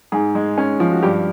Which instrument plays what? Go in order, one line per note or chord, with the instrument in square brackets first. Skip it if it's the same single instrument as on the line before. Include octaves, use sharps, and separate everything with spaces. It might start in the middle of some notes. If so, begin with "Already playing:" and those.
[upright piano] G#2 G#4
G#3
C#4
F3
F#4
G2 G4